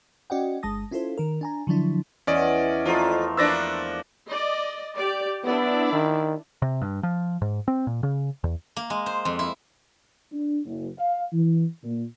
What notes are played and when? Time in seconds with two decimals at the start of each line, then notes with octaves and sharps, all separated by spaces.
0.30 C#4 F#4 D5 D#5 F#5 G5
0.63 G1 G#3 A5 D#6 A#6
0.91 C#4 E4 F4 A4 C5
1.18 D#3 A#4
1.41 D4 G#5 A#5
1.67 D3 F3 F#3 D4 E4
2.27 E2 C#4 D5 D#5
2.85 F2 F3 A3 F4 A#4
3.37 F3 A#3 D4 B4 D5 E6 A6 A#6
4.28 D5 D#5
4.96 G4 D5
5.44 B3 D4 E4 D5
5.92 D#3
6.62 C3
6.81 G2
7.03 F3
7.42 G#2
7.68 C4
7.87 A#2
8.03 C#3
8.44 E2
8.77 A#3
8.90 G#3
9.06 C5
9.25 F2
9.39 E4
10.32 D4
10.65 F#1
10.99 F5
11.33 E3
11.84 A#2